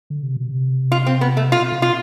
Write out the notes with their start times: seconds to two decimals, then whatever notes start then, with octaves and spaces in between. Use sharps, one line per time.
0.10 D3
0.23 C3
0.36 B2
0.49 C3
0.92 F4
1.06 C4
1.21 B3
1.37 A3
1.52 B2 F4
1.72 C3
1.82 B2 F4